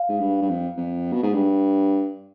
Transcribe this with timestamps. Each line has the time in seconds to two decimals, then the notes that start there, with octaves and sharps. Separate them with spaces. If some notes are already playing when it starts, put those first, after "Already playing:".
Already playing: F5
0.09 G#2
0.20 G2
0.41 G2
0.49 F2
0.77 F2
1.12 B2
1.23 G#2
1.34 G2